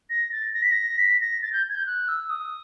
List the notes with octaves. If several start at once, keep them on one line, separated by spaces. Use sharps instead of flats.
A#6
A6
A#6
B6
A#6
B6
A#6
A6
G6
G#6
G6
F#6
E6
D#6